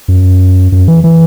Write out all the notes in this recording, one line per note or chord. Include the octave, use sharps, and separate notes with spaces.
F#2
F#2
E3
E3